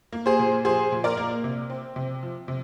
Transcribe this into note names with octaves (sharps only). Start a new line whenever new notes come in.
A#3
G#4 C5
A#2
F3 G#4 C5
A#2
A#4 D5
A#3
C3
C4
C3
F3
C3